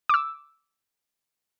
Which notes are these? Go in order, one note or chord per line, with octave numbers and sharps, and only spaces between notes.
D6 E6